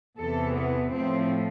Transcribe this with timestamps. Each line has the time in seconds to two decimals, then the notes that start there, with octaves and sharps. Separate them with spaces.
0.18 E2 C3 E3 A4
0.55 B3
0.93 A2 F3 A3 C4